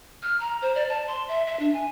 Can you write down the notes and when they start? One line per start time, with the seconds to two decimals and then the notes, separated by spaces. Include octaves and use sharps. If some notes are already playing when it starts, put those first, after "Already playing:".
0.23 F6
0.40 A#5
0.62 C5
0.75 D5
0.89 A5
1.08 C6
1.28 E5
1.47 E5
1.60 D4
1.74 G#5